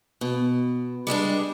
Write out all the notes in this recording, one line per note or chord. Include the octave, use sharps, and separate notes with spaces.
B2
G3 G#3 C4 D4